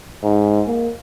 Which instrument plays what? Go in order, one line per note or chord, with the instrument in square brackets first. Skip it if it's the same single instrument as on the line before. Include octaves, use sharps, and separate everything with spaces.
[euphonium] G#2
A#3